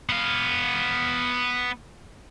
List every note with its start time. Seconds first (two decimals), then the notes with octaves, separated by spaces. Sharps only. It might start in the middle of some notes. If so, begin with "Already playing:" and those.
0.09 B3 F5